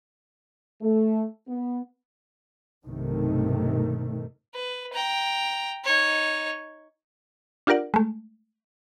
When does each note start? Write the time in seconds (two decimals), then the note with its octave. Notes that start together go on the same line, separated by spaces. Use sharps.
0.82 A3
1.48 B3
2.85 B1 G2 C3 D#3 A3
4.54 B4
4.93 G5 A#5
5.85 D#4 C#5
7.67 D4 F4 G4 A#4 D5 F#5
7.94 G#3 A3